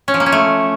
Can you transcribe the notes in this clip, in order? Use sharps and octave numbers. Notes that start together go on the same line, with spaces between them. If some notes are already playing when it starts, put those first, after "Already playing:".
C#4
F3
A#3
C#4
A3